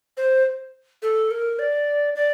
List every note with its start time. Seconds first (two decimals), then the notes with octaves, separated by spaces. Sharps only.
0.17 C5
1.02 A4
1.31 A#4
1.59 D5
2.15 D5